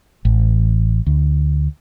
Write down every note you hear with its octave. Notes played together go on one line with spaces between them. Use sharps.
A1
D2